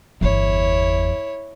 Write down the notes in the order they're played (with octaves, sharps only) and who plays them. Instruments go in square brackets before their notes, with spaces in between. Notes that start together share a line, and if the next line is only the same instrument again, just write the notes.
[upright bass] G1 E2 [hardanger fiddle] E4 C#5